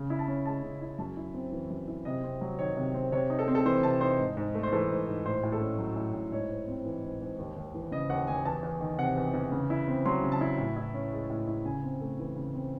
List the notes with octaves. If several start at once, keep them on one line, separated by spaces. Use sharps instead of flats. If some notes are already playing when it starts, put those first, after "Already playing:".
Already playing: C#3
E4
A5
C#4
G#3 A5
C#3
E4
F#2 A5
E4
C4
E3
F#2
E4
C3 D#5
C4
F#3
D#3 C#5
C3
C4
C3 C#5
D#4
A4
C4
A4
E3 C5
C3 A5
D#4 C5
G#2
G#2
A3
C5
E3 A4
G#2
G#2
A2 C5
A2
A4
C#4
F#3
A2
A2
G#2 C#5
G#2
C4
E3
G#2
G#2
D#2
D#2
E3
C#3 D#5
D#2 F#5
D#2 G#5
E2 A5
E2
D#3
C3 F#5
E2
E2
C#3
E4
C4
F#3 C6
C#3
A5
E4
A2
E4
C#4
G#3
A2
E4
C#3 G#5
C4
A3
E3
C#3
C4